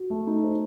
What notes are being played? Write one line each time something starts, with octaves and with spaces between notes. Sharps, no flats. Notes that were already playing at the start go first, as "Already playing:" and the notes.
Already playing: F#4
A3
D#4
C5